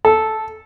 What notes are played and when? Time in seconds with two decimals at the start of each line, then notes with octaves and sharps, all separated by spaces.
0.05 A4